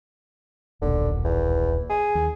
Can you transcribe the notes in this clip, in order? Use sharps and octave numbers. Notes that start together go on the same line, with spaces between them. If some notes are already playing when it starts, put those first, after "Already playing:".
D#1 B1 A#2 D3
E2
G#4
D#2